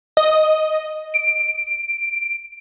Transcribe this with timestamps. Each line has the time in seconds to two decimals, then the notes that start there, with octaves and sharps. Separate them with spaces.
0.17 D#5
1.14 D7